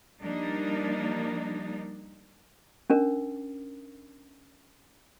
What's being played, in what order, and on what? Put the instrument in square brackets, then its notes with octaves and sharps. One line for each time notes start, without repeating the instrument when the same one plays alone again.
[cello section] F3 G3 A#3 D4 D#4
[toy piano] C#4 D4 A#4